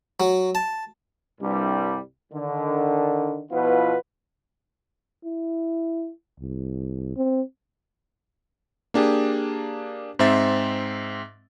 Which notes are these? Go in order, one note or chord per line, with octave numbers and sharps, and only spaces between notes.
F#3
A5
C2 G2 G3
D3 D#3
B2 F3 B3 E4 F4 B4
E4
C2
C4
A#3 D4 G4 G#4
G#2 C4 E5 A6